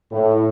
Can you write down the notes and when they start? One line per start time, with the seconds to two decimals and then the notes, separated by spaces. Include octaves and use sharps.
0.12 A2